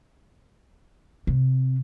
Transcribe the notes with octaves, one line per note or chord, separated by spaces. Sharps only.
C3